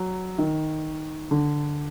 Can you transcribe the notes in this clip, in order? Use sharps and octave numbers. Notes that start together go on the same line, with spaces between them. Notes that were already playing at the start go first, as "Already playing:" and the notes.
Already playing: F#3
D#3
D3